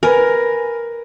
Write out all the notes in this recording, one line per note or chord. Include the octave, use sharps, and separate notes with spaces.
A#4 B4 G#5